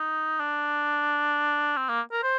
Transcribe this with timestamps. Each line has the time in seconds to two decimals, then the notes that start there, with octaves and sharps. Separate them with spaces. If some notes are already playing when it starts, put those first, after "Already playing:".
Already playing: D#4
0.40 D4
1.77 C4
1.89 A#3
2.12 A#4
2.23 C5